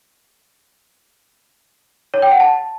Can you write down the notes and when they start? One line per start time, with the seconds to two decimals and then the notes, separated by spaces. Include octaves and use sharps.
2.14 C#5
2.22 G5
2.31 F#5
2.40 A5